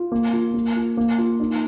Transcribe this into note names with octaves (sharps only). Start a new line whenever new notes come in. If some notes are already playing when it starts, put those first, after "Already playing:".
Already playing: F4
A#3
F4
A#3
F4
A#3
F4
D#4